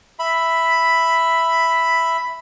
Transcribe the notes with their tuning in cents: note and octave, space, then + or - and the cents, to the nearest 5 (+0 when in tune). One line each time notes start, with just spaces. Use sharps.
E5 +0 B5 +5